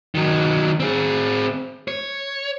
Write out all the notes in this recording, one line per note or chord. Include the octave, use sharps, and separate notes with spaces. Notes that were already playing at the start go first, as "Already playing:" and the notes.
D#3 F#3
C4 G#4
C#5